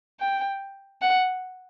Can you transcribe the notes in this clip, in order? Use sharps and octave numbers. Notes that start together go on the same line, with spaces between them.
G5
F#5